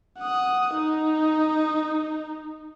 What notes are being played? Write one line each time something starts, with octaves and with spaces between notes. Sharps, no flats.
F#5 D#6
D#4